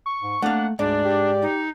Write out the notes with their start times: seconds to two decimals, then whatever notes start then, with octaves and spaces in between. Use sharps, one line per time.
0.06 C#6
0.21 G#2
0.42 A3 A#3 D4 F5 F#5
0.79 D2 G#2 D4 D5
1.04 G4
1.42 D#4